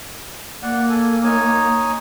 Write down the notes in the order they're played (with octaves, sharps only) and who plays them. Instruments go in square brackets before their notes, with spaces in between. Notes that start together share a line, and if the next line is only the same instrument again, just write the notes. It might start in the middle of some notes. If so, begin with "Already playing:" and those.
[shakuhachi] A#3 [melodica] D5 F#5
[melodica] A4 G#5
D#4 C#5 G#5